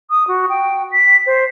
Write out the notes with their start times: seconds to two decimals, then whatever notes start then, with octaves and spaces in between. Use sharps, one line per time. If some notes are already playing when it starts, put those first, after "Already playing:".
0.10 D#6
0.28 F#4
0.49 G5
0.92 B6
1.26 C5